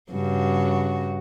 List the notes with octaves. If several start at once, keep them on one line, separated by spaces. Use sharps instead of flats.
G2 C#3 F#4